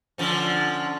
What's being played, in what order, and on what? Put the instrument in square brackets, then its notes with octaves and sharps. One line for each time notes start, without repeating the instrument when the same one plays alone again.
[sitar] D3 F3 C#4